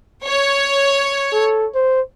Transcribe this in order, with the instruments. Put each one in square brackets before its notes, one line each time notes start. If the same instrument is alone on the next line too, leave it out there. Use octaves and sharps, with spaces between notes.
[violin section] C#5
[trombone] A4
C5